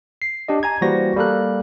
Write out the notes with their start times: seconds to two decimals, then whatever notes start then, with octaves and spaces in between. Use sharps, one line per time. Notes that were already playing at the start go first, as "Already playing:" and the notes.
0.22 C7
0.48 D4 G4 D#5
0.63 G#5 A#5 G#6
0.81 E3 G3 A#3 F#4 C5 A#6
1.16 G3 A#3 G4 A4 A#4 F#6